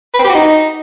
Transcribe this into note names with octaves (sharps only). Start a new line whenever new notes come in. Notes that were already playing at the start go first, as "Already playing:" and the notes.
B4
C4
G4
F#4
D#4